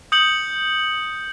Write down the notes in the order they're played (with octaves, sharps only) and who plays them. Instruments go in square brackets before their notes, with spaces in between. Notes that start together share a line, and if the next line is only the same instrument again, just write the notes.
[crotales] D#6 G6 C#7 F#7